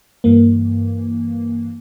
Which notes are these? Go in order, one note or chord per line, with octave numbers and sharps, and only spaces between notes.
G2 E3 A#3